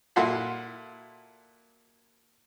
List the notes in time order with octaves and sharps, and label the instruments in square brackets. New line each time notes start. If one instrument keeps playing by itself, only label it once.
[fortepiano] A#2 E4 F#4 A4 C6